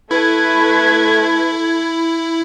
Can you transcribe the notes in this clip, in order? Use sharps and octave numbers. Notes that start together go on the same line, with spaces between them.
A3 E4 B4 G#6